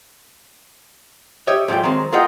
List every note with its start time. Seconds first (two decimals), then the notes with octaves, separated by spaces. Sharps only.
1.47 G4 C#5 D#5 E5
1.68 G#2 F3 A3 D5 G5
1.83 D#3 F#3 G#3 C4
2.12 F4 G#4 A#4 D#5 F#5 G5